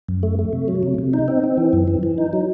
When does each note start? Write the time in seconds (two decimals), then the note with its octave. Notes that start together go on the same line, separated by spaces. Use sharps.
0.08 F#2
0.23 A3
0.39 A3
0.53 C3
0.68 F#3
0.83 C3
0.98 C3
1.13 D#4
1.28 C4
1.43 C4
1.57 E3
1.73 F#2
1.87 E3
2.03 E3
2.18 D#4
2.33 F#3